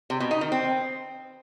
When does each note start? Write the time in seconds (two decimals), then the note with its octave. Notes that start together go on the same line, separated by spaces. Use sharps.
0.10 C3
0.20 B2
0.31 D#4
0.41 D#3
0.52 C4